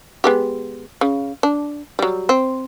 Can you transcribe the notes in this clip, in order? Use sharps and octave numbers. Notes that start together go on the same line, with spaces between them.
G#3 B3 G4
C#3
D4
F#3 G3
C4